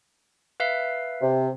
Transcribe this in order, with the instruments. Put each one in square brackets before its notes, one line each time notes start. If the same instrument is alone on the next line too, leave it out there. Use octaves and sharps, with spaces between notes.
[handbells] B4 E5 F5
[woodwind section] C3